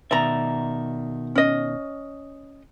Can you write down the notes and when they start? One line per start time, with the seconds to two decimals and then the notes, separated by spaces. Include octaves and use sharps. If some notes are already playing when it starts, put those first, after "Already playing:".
0.11 B2 D#3 D5 E5 A#5
1.35 C#4 D#5